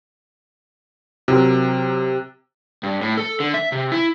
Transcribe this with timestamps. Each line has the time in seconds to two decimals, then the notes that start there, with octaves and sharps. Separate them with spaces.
1.28 C3 F#3 C4 A#4
2.83 G2
3.01 A2
3.18 A4
3.40 D3
3.54 E5
3.72 C3
3.92 E4